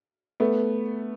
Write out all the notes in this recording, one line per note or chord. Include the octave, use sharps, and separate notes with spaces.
A3 B3